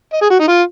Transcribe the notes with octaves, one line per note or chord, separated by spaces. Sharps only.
D#5
G#4
F#4
D#4
F4